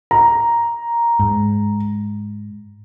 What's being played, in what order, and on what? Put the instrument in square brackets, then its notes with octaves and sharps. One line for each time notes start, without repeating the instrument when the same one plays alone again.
[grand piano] A#5
[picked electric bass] G#2